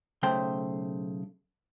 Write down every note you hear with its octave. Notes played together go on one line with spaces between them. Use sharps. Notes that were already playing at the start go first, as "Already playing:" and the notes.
B1 C#3 A3 C5 G5